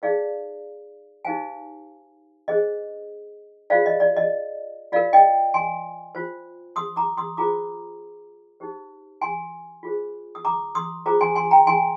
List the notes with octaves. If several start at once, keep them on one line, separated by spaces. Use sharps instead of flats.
D#4 G#4 C5 D5 F5
D#4 G4 C5 F5 G#5
D4 G#4 C5 D#5
F4 G#4 C5 D5 F5
D#5
D5
D#5
F4 A#4 D5 F5
D#5 G5
G#5 C6
F4 C5
C6 D#6
A#5 D6
C6 D#6
F4 G#4 C5 A#5 D6
D#4 G4 C5
G#5 C6
F4 G#4 C5
D#6
A#5 D6
C6 D#6
F4 G#4 C5 A#5 D6
G#5 C6
G#5 C6
G5 A#5
G#5 C6